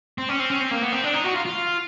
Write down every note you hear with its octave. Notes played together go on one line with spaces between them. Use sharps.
C4
C#4
C4
C#4
C4
A#3
B3
C4
D4
D#4
F#4
F4
F4